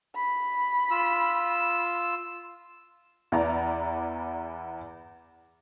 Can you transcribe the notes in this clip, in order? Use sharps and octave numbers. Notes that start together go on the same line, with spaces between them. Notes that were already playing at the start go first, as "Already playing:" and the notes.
B5
F4 E6
E2 E4 B4 D5 A#5